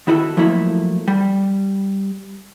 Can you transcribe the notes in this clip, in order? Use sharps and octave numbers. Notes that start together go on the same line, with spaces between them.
D#3 E4 F#4 G#4 A4
F3 F#3 A3 A#3 E4
G3